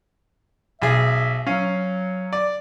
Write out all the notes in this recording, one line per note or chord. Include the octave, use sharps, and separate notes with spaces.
B1 G#4 E5
F#3 C#4 F5
D5